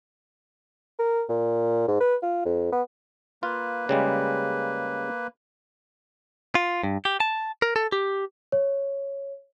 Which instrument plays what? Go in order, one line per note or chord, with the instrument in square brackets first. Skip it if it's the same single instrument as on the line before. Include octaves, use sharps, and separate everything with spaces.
[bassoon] A#4
A#2
G#2
B4
F4
F2
B3
[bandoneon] A#3 B4 [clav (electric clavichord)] F4
[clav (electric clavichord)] C#3 G3 G#3
[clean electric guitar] F4
G2
G4
A5
A#4
A4
G4
[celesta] C#5